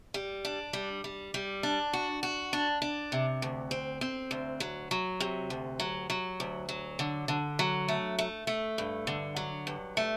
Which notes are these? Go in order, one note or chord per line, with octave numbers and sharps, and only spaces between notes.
G3
D4
G3
G3
G3
D4
F#4
F#4
D4
D4
C3
D2
C4
C4
D2
F#3
F#3
C3
D2
F#3
F#3
D2
F#3
D3
D3
F#3
A3
A3
A3
G2
D3
F#3
G2
A3